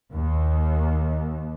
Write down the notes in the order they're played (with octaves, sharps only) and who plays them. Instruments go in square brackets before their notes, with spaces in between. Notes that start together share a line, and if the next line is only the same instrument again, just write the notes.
[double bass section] D#2